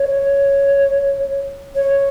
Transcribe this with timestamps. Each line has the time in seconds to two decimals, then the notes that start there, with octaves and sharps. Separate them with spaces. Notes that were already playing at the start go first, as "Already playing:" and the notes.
Already playing: C#5
1.76 C#5